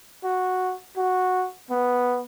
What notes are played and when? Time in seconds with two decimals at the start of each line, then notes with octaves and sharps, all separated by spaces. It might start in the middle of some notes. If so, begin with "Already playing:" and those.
0.24 F#4
0.97 F#4
1.70 B3